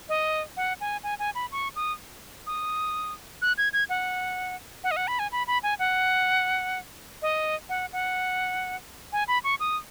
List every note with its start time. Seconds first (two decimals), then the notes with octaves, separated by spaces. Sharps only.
0.09 D#5
0.57 F#5
0.81 G#5
1.03 G#5
1.19 G#5
1.35 B5
1.52 C#6
1.76 D#6
2.47 D#6
3.42 F#6
3.58 G#6
3.73 G#6
3.89 F#5
4.84 F#5
4.91 D#5
4.97 F#5
5.08 B5
5.19 G#5
5.32 B5
5.47 B5
5.63 G#5
5.79 F#5
7.22 D#5
7.69 F#5
7.93 F#5
9.13 G#5
9.28 B5
9.44 C#6
9.60 D#6